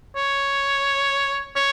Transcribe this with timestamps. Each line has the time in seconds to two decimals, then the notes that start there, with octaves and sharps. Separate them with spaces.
0.16 C#5
1.56 C#5